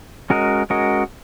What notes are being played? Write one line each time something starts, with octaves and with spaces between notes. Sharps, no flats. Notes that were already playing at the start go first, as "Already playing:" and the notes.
G#3 C#4 F#4 A#4 D#5
G#3 C#4 F#4 A#4 D#5